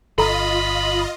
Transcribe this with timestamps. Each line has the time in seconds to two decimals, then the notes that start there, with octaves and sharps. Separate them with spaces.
0.18 G1 F4 A4 D#5 A#5 B5